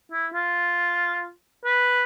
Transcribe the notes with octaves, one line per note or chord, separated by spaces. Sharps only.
E4
F4
B4